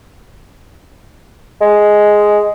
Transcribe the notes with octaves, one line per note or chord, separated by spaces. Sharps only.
G#3